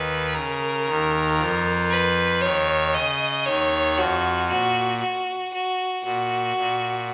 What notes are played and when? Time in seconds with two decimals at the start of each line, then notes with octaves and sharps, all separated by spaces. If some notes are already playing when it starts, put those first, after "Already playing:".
Already playing: D#2 D#3 B4
0.35 C#3 A#4
0.87 D#2 D#3
1.38 F2 F3
1.91 B4
2.42 D#2 D#3 C#5
2.94 C#3 D#5
3.45 D#2 D#3 C#5
3.98 F2 F3 F#4
4.49 A#2 F#4
5.01 F#4
5.53 F#4
6.04 A#2 F#4
6.57 A#2